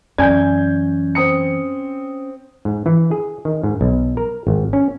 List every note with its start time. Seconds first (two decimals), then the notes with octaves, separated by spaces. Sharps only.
0.18 F#2 E3 C#4 D5 G#5 G6 G#6
1.15 C4 D#6 C#7
2.65 G#2
2.86 E3
3.11 G#4
3.45 D#3
3.63 G#2
3.81 B1
4.17 A#4
4.47 G#1
4.73 C#4